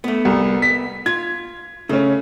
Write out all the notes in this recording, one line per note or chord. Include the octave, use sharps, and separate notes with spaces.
A3 B3
C2
B6
F4 G#6
C#3 A3 C#4